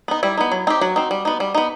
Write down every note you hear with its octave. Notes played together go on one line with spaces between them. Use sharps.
B3 D#4
G3 E4
B3 D#4
F#3
C4 D#4 G4
F#3 F#4
C4 D#4
G3
B3 D#4
G3
B3 D#4